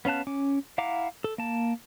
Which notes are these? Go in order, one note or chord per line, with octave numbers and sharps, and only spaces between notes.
B3 C#4 F5 A5 F#6
C#4 D6
E4 F5 F#5 A#5 D6
A4
A#3 A5